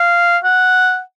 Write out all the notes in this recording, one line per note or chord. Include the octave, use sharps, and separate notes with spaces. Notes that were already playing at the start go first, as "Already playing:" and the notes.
Already playing: F5
F#5